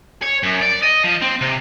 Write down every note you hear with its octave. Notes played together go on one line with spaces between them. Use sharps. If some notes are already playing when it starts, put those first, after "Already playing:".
C#5
F#2
D5
D#5
F3
C4
C3